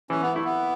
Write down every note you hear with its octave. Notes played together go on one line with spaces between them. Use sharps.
E3 C#4
B3
A3 E4
B3